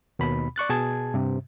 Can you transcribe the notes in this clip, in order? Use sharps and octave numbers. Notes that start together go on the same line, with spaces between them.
D#2 B2 B5
D5 C#6 F#6 A6
B2 G#4 A5 G#6
G2 C3